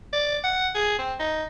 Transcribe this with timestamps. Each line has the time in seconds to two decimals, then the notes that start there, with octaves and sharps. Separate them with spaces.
0.13 D5
0.44 F#5
0.75 G#4
0.99 C4
1.20 D#4